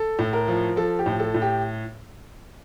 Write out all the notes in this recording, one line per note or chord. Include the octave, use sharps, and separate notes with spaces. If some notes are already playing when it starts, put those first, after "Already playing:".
Already playing: A4
A2
A#4
F3
F3 A4
G4
A2
A4
A2
G4